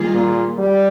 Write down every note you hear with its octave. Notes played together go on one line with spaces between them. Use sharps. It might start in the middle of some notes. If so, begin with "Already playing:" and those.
Already playing: D#3 G3 A#3 F4 G#4
A#2
G3